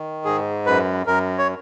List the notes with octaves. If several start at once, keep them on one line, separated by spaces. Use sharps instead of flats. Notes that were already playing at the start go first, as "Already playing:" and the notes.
Already playing: D#3
G#2 G#4
F#2 B4
F#2 A#4
C#5